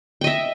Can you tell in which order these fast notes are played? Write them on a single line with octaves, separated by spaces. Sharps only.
G5 D#5 E5